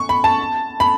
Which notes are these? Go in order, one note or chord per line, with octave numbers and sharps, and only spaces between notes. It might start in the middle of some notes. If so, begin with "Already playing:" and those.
Already playing: C#6
B5
A5
B5